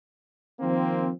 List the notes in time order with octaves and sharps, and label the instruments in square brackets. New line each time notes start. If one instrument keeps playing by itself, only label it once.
[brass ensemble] D#3 F3 A#3 C4